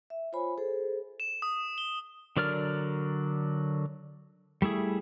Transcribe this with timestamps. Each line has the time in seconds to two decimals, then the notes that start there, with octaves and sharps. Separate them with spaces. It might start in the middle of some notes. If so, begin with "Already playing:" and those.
0.10 E5
0.33 F4 C5 C#5 G#5 B5
0.58 G#4 A4 C5
1.20 E7
1.42 D#6
1.78 G7
2.37 D3 F#3 A#4 D5 F6
4.62 G3 A3 E4 G#4